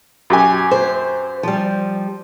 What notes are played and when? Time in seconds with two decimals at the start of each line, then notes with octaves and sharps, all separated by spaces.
0.30 F#2 G4 G#5
0.71 C5
1.43 F3 G3